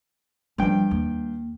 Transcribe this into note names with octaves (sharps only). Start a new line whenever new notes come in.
G2 F3 G3 G5
D#2